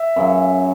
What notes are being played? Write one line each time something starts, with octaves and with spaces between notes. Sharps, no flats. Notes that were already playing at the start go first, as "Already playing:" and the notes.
Already playing: E5
F#2 C#3 F#3